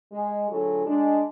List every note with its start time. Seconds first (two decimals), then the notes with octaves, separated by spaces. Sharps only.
0.12 G#3
0.50 A2 D3 F#3 F4 G#4 A4
0.86 G#3 D4